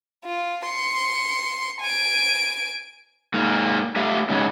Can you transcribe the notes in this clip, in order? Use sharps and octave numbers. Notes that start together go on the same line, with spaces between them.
F4
C6 C#7
G#5 D7
G#2 A#3
A3 G4 E5 F5
G#2 C#3 F#3